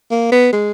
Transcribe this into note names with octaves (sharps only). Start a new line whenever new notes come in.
A#3
B3
G#3